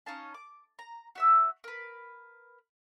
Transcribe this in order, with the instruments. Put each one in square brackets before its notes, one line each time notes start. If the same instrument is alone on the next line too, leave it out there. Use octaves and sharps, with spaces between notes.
[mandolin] C#4 D#4 F5 A5
D6
A#5
F#4 E5 E6
A#4 B4